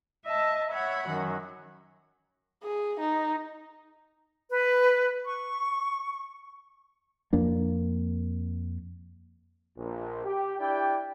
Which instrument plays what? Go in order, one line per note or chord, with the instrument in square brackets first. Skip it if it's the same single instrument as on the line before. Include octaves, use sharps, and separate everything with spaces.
[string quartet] D#5 E5 A5
C#5 E5 F#5 B5
F#2 D#3
[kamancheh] G#4
D#4
[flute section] B4
C#6
[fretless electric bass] F2 A#3 D4
[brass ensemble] A#1
G4
D4 E4 G4 D5 G5